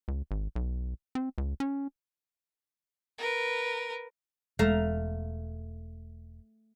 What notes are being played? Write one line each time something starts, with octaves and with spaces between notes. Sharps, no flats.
C#2
G#1
B1
C4
C#2
C#4
A#4 B4
E1 G#3 A3 F5 A#5